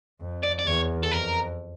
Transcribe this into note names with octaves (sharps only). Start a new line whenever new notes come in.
F2
D5
D5
E2 C#5
A4
F2 A#4